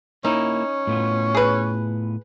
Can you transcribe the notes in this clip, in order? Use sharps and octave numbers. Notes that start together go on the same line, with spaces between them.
A#3 C#4 D#4 E4
A2 B3 F4
G#4 B4